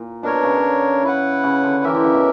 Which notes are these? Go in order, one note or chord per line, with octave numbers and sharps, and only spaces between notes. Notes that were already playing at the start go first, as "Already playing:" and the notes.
Already playing: A#2
B2 D4 A#4 C#5
C#3
E4 B4 F#5
C#3
D3
E3 G4 A#4 E5
D3
C#3
B2